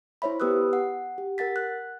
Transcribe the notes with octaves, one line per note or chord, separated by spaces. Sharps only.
E4 C5 C#5 E5 B5
B3 G4 B4 D#6 E6 F#6
F#5
G4
A#4 F#5 A6 B6
F#6